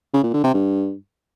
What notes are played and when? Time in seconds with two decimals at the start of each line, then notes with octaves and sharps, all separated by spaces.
0.13 C#3
0.24 A#2
0.34 D3
0.44 C3
0.54 G2